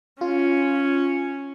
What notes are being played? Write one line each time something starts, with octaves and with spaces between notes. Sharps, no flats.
C#4 F4